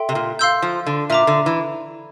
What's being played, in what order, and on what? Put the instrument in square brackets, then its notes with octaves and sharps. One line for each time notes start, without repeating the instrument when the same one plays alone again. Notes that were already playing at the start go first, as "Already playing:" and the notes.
Already playing: [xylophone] A4 E5 G5 C6
[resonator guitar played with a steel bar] C3
A#2
[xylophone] F5 C6 E6 G6
[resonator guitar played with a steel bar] F3
D3
[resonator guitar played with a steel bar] A#2 [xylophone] E5 A#5 D6
[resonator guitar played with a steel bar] D3
E3